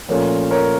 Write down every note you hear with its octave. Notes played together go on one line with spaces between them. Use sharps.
A#2 F3 A3 C#4 F4 A#4 C#5
A#4 C#5